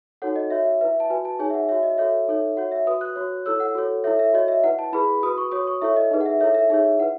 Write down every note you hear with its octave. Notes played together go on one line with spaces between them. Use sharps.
D#4 F#4 A4 C#5 F#5
D#5
F#4 C#5 E5
E5
E4 B4 E5
A5
F#4 B4 G#5
A5
D#4 G#4 C#5 G#5
E5
F#5
F#4 C#5 E5
D#5
F#4 A4 C#5 E5
D#4 A4 C#5
F#4 C#5 F#5
E5
F#4 B4 D#6
F#6
F#4 C#5
E4 A4 C#5 E6
F#5
F#4 A4 C#5
E4 A4 C#5 E5
E5
F#4 C#5 D#5
E5
E4 B4 F#5
A5
E4 G#4 B4 B5
F#4 B4 D#6
C#6
F#4 C#5 D#6
C#6
E4 A4 C#5 E5
D#5
D#4 G#4 B4
F#5
E5
E4 A4 C#5 E5
E5
D#4 G#4 C#5 E5
E4 B4 F#5